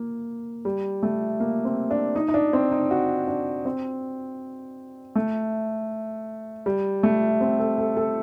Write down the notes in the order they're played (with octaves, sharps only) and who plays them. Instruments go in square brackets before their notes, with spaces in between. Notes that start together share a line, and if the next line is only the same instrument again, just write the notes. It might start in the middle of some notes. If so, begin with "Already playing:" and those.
Already playing: [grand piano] A#3
G3
A3
A#3
C4
D4
D#4
D#4
D4
C4
D#4
F#4
D4
C4
A3
G3
A3
C4
A4
A4
A4